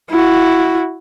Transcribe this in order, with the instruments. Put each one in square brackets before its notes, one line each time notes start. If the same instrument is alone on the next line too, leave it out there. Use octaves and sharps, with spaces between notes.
[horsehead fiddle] E4 F#4